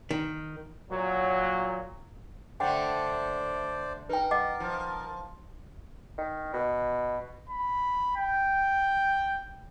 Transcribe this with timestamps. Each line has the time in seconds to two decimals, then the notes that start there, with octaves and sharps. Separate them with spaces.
0.11 D#3
0.91 A#2 F#3
2.60 D3 A3 C5 D5 F#5 G5
4.09 D#4 A#4 B4 G5
4.31 D#5 F#5 D6
4.60 F3
6.18 D#3
6.53 B2
7.49 B5
8.16 G5